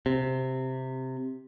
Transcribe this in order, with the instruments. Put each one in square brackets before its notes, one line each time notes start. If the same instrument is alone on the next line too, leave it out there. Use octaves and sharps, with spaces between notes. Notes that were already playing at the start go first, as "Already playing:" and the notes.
[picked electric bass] C3